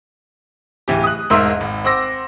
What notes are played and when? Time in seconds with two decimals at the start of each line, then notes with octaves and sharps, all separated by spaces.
0.88 D1 E3 G4
1.04 D#6 F#6
1.30 E1 G#2 A#4 E5 C6 E6
1.60 G#1
1.84 C4 F#5 C6 D6 E6 A#6